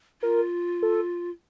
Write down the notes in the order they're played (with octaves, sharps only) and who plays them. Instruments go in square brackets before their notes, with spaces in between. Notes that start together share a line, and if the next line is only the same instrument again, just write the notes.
[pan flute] F4 [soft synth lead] A#4
[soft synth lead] A4